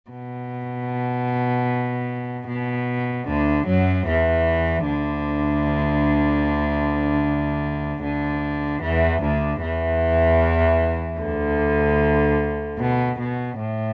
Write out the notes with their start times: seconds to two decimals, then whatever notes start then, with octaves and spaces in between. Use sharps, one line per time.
0.10 B2
2.48 B2
3.27 D2 D3
3.66 F#2 F#3
4.07 E2 E3
4.86 D2 D3
8.02 D2 D3
8.82 E2 E3
9.22 D2 D3
9.62 E2 E3
11.19 D2 D3
12.79 B2
13.18 B2
13.58 A2